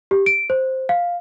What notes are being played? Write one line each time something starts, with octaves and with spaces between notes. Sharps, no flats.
G4
D7
C5
F5